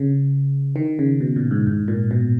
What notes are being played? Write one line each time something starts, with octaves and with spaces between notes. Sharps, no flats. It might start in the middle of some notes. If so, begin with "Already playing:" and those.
Already playing: C#3
D#3
C#3
B2
A#2
G#2
G#2
A#2
B2